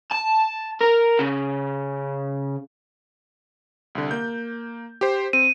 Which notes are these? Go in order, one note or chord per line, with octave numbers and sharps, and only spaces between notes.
A5
A#4
C#3
C2 D3
A#3 G6
G4 C5
C4 D#7